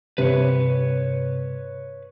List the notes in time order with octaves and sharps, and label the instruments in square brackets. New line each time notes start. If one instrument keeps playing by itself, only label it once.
[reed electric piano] G2 C3 [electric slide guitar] B4 C#5